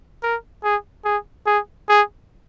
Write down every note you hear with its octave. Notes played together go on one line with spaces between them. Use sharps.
A#4
G#4
G#4
G#4
G#4